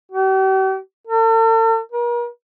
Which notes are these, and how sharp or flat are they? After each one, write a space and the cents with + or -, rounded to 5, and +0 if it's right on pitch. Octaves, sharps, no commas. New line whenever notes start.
G4 -45
A4 +45
A#4 +40